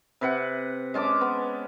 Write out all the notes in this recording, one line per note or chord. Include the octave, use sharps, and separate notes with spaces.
C3 B4 F#5
G#3 C#4 A5 D6
B3